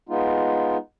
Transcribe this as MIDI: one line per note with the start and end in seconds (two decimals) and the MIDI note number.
0.09 0.77 56
0.09 0.77 59
0.09 0.77 63
0.09 0.77 65